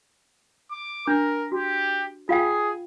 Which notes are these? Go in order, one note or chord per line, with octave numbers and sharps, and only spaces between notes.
D6
D4 A#4
F#4 G4
F4 G#4 F5 G5